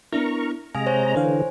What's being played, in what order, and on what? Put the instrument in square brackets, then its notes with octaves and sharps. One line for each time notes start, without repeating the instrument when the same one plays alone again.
[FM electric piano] B3 D4 E4 [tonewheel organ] A#4 A#5 C#6
[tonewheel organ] C3 G#3 A#5 [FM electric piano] F5 D#6 [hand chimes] G#5
[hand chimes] C5 C#5 G#5
[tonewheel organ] D3 E3 [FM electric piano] D4 F5